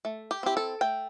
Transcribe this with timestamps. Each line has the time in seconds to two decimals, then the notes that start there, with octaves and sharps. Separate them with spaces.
0.05 A3
0.31 G4
0.43 C4 E4 G4
0.57 A4
0.81 A3 G5